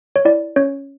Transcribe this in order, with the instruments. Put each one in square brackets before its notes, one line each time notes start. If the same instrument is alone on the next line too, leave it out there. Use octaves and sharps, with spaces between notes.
[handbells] C#5
E4 D5
C#4 C#5